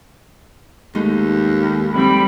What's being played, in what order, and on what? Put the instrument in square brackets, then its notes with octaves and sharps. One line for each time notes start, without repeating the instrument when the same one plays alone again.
[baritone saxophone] D#2 [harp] G#3 A3 D#4
[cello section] G3 C4 [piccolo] B5